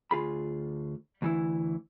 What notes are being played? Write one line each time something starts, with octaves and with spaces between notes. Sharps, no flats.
D2 F4 G#4 B5
D2 E3 E4